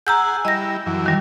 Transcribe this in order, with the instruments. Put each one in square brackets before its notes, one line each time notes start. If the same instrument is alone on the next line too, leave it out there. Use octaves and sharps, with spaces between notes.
[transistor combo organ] G#4 F#5 [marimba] A#5 E6 G6
[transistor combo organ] G3 E4 [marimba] D#5 A#6
[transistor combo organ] F#2 E3
[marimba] D#3 G3